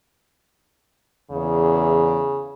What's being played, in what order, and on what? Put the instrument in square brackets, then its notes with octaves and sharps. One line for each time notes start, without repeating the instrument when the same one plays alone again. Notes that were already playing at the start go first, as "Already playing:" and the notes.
[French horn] E2 [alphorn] C#3